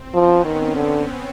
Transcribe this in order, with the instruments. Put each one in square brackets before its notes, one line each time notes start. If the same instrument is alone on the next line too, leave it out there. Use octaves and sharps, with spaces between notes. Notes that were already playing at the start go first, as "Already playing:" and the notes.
Already playing: [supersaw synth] C4
[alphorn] F3 [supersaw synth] B3 C#4
[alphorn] D#3 [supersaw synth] C4
[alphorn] D3